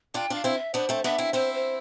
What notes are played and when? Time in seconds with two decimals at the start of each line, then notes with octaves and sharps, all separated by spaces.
0.14 D4 F4 G5
0.30 D4 F4 F5
0.44 C4 E4
0.55 E5
0.74 B3 D4 C5
0.89 A3 C4
1.04 B3 D4 E5
1.18 C4 E4
1.33 C4 E4 C5
1.54 C5